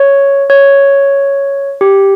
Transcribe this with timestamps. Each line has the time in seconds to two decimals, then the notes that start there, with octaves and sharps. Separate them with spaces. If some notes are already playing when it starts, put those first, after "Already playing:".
Already playing: C#5
0.50 C#5
1.81 G4